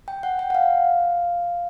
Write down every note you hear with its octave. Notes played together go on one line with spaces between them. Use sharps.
G5
F#5
G5
F#5
F5